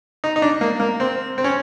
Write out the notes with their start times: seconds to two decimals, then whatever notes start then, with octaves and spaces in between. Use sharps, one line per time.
0.24 D#4
0.36 D#4
0.42 D4
0.61 A#3
0.80 A#3
1.00 C4
1.38 C4
1.44 C#4